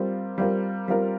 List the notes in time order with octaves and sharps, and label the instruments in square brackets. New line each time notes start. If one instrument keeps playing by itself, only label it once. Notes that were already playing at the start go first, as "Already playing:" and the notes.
Already playing: [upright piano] G3 C4 F4 A#4
G3 C4 F4 A#4
G3 C4 F4 A#4